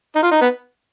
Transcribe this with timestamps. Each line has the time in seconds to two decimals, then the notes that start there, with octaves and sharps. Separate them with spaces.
0.16 D#4
0.23 F4
0.32 D#4
0.41 B3